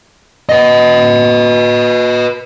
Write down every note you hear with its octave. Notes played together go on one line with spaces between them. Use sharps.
B4 D#5